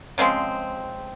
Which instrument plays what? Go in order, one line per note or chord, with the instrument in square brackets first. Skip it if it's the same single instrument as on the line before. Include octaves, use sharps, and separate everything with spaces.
[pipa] C#3 F3 G#3 C4